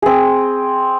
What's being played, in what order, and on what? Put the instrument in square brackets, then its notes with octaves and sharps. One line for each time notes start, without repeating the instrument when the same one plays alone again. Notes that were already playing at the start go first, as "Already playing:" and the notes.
[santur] C4 G#4